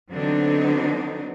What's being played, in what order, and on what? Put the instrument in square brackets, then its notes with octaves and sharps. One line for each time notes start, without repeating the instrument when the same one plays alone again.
[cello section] D3 F#3 B3 C4 D4 D#4